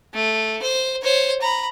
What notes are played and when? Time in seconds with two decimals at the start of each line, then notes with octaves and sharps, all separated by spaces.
0.14 A3
0.62 C5
1.02 C5 C#5
1.41 A#5 B5